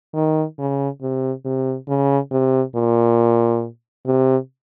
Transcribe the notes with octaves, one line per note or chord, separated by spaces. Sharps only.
D#3
C#3
C3
C3
C#3
C3
A#2
C3